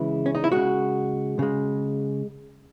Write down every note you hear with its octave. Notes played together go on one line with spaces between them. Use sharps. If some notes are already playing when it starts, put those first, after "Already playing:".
Already playing: C#3 E3 G#3 E4
C#4
D#4
E4
C#3 G#3 F#4
C#3 G#3